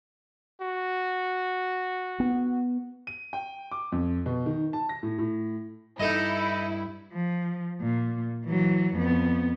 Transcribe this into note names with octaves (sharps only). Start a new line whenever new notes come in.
F#4
B3
D#7
G5
D6
F2
B2
D#3
A5
A#6
A2
A2
G2 D#4 E4 A4 D#5
F3
A#2
E3 F#3
F2 B3